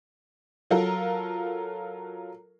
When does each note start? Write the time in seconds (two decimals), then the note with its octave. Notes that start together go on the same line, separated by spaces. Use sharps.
0.71 F#3 F4 A4 A#4